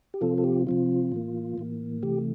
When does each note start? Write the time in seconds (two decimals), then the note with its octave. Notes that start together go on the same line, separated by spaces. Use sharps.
0.14 G4
0.21 C3 F3 C4 F4 A4
0.38 A4
0.44 G4
0.67 C3 F3 C4 F4
1.12 A2 E3 A#3
1.58 A2 E3 A#3
2.03 C3 E3 A3 G4